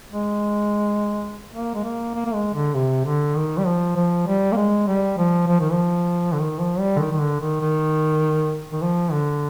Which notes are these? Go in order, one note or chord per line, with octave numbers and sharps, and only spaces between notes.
G#3
A#3
G#3
A#3
A#3
A#3
G#3
D3
C3
D3
D#3
G3
F3
F3
G3
A#3
G#3
G3
F3
F3
D#3
F3
D3
D#3
F3
G3
D3
D#3
D#3
D3
D#3
D#3
D#3
F3
D3